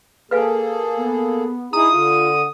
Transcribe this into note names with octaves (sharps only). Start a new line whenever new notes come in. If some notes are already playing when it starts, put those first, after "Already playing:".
A#3 G#4 A4 B4 F5 G#5
B3
D#4 E4 G#4 A#5 D#6
D3 F4